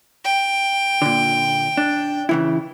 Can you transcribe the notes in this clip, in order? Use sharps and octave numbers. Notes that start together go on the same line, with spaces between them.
G5
A#2 D3
D4
C#3 E3 E4